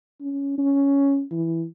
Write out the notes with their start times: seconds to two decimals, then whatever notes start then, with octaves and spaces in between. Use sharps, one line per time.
0.21 C#4
0.58 C#4
1.31 E3